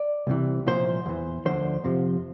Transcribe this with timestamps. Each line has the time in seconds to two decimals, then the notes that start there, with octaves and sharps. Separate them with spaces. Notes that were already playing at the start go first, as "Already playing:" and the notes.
Already playing: D5
0.27 C2 C3 E3
0.66 C2 A#2 F3 C5
1.06 E2 E3
1.45 D2 D3 F3 C5
1.84 F2 C3 F3